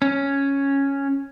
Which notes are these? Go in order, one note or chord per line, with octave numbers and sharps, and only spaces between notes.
C#4